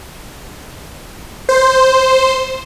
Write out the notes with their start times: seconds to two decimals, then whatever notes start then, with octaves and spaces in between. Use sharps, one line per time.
1.49 C5